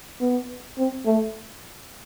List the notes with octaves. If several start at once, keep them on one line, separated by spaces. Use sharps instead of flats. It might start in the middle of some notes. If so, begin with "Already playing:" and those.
B3
C4
A3